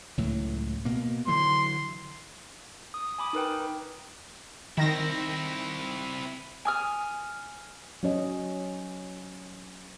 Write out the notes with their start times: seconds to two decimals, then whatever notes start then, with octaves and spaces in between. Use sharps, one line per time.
0.18 C#2 A2 F#3
0.85 B2 A#3
1.27 D3 E3 F#3 C6
2.94 D#6
3.18 G#5 B5 D6 D#6
3.33 D#4 A#4 B4 G5
4.78 D#3 C4 E4 A#6
6.65 G#5 D#6 F6
8.03 F#3 C#4 D#5